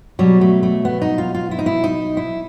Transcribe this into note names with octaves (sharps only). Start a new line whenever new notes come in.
B2 F#3 G3
A3
A3
B3
D#4
F4
F4
E4
D#4
E4
D#4
E4